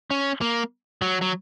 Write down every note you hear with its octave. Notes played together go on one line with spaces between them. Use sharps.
C#4
A#3
F#3
F#3